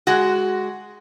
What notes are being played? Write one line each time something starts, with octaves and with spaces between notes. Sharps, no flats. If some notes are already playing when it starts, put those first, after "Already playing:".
G#3 F#4